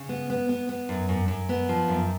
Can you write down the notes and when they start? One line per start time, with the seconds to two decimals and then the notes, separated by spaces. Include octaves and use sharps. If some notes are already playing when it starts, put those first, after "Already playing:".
Already playing: C#3
0.09 B3
0.30 B3
0.49 B3
0.69 B3
0.89 F#2
1.09 F#2
1.28 F#2
1.49 B3
1.69 F3
1.88 F#2